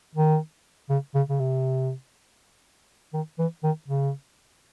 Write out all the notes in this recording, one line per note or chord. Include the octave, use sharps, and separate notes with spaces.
D#3
C#3
C#3
C#3
C3
D#3
E3
D#3
C#3